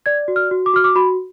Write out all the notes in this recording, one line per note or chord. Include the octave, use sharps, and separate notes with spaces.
D5 G#6
F#4
F6
F#4
D6
F#4 F6
D6
F#4 B5